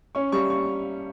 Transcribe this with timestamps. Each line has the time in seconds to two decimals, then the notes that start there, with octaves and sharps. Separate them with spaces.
0.15 C#4 C#6
0.32 G3 C#6
0.50 C#6